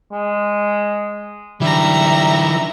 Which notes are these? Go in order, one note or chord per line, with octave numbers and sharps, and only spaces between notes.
G#3
D3 E3 G3 E5 A#5